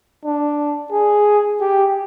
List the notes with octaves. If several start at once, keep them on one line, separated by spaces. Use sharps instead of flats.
D4
G#4
G4